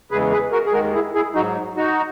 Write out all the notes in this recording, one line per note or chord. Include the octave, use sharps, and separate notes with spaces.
E2 C#3 E3 G#3 G#4 B4
G#4 B4
F#4 A#4
G#4
D#2 D#3 G#3 F#4 A#4
E4 G#4
E4 G#4
G#2 F#3 D#4 F#4
D#4 F#4